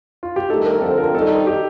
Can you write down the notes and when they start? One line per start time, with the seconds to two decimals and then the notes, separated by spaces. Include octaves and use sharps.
0.23 F4
0.36 G4
0.50 G2 D#3 A3 D#4 A4
0.65 A#4
0.81 D3 F3 C4 A4
0.98 A#4
1.14 G2 D#3 G3 C4 D#4 A4
1.47 G4